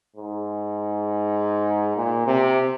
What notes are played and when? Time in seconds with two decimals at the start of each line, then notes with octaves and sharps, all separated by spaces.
0.16 G#2
1.97 A#2
2.27 C3